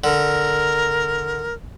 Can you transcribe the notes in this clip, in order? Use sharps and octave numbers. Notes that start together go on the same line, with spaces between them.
D3 A#4